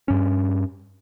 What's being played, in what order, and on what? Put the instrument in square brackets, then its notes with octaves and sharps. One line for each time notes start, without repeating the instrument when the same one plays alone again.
[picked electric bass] G2 C#4